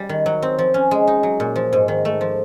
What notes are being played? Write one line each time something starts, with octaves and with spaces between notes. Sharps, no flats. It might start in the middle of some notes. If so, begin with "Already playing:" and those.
Already playing: G3
D#3
F#3
C4
F3
C#4
G#3
D#4
F#3
A#2
F3
G#2
D#3
A3
F3